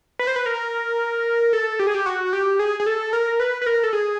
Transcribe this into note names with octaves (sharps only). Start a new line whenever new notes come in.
B4
C5
B4
A#4
A4
G4
G#4
G4
F#4
G4
G#4
G#4
A4
A#4
B4
B4
A#4
A4
G#4